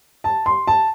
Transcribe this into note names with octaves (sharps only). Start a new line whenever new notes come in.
A5
C6
A5